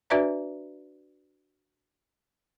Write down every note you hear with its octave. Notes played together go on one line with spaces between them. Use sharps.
D4 F#4 B4 D5 E5 A#5